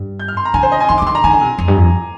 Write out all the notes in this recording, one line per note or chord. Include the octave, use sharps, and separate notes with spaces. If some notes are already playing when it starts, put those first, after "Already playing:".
Already playing: G2
G6
F6
C6
A#5
D3 G#5
C5
D#5
G#5
D#3 C6
D3 D6
D#3 C6
D3 A#5
D#3 G#5
D3
C3
F2
G2
F2